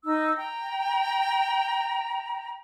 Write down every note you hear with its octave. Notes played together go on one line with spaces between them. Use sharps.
D#4 E6
G5 A#5